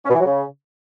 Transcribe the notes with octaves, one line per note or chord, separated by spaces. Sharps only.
C#4
B2
E3
F#3
C#3